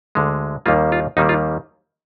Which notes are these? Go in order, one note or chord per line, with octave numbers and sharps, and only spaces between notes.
D2 D3 G#3
D#2 D#3 G3 A#3 F4
F4
D#2 D#3 G3 A#3 D#4
F4